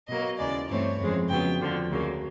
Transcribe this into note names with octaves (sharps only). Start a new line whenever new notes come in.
B2 F#3 A#3 D#5
D#2 C#3 E3 G#3 D5
G2 E3 A3 C4 C#5
F2 C#3 E3 G#3 C4
F2 C#3 F#3 B3 G5
F2 D3 F3
D2 C#3 F#3 A#3